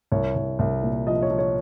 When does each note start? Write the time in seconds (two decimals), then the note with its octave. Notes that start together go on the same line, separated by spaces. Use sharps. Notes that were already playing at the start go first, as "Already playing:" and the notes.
0.12 C2 C#5
0.35 C2
0.59 C2
0.82 A#2
1.07 F3 D#5
1.22 C#5
1.30 F3
1.38 C#5